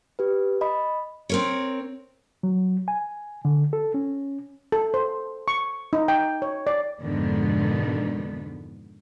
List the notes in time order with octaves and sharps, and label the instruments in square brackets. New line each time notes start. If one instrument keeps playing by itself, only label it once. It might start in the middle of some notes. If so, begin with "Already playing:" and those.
[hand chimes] G4 B4
D#5 B5
[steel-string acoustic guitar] C4 A#4 C#5
[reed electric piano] F#3
G#5
D3
A4
C#4
[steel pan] A4
C5
C#6
D#4
G5
C#5
D5
[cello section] F2 G#2 B2 D3 D#3 B3